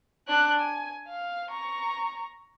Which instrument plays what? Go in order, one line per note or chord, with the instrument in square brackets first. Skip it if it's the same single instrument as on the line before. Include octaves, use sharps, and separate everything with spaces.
[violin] D4 F#6
G#5
F5
A#5 C#6